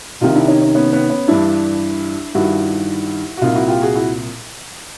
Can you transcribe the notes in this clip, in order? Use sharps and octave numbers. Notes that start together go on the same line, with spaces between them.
C2 C3 D#3 D#4 F4
D4 E4
C#4 D#4
C#4 D#4
B3 C#4
B3 C#4
B3 C#4
G2 E3 D4 E4
G2 D#3 E4 F#4
F#4
C2 A#2 D#4 F4
E4 F#4
F4 G4
F#4 G#4
E4 F#4